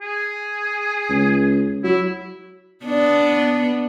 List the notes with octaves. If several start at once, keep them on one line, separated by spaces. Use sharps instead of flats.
G#4
C#2
F#3 E4
B3 D4